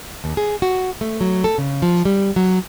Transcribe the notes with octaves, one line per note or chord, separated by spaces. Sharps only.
D#2
G#4
F#4
A3
F#3
A4
C#3
F3
G3
F#3